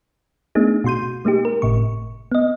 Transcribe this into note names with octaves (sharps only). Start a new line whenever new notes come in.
A3 B3 D4 D#4 G#4
B2 F#4 C6 G6 D#7
G#3 A#3 D#4 G4
A#4
G1 A2 C3 C#6
B3 D#5